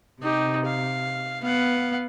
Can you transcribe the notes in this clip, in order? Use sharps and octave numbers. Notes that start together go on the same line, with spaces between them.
C3 D#4 G4
F5
B3 F5 F#5